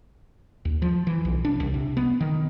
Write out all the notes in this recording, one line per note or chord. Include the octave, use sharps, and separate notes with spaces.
D#2
F3
E3
B1
D4
C2
C3
B3
D#3